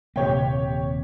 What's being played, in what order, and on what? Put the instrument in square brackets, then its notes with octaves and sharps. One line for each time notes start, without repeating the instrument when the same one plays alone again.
[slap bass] D#1 C3 A#3 [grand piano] G4 C#5 G5